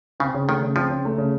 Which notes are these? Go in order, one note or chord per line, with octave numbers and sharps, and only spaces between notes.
C#3 C4
C#3
D#3 A3
C#3
F3 C4
C#3
A3
C#3